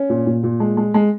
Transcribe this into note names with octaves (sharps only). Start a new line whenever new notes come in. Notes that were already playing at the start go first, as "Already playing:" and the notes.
Already playing: C#4
A#2
A#2
A#2
G#3
G#3
G#3